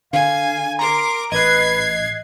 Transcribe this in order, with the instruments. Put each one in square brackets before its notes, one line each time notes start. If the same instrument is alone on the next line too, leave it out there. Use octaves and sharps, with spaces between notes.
[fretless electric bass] D3 [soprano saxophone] F5 [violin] G#5
[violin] A#4 D6 [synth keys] A#5 [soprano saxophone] C6
[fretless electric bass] A1 [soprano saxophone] B4 [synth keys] D#5 F#6 [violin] G#6 C7